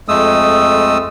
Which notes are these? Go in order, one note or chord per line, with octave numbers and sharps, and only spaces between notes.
F2 G#3 A3 D#6 E6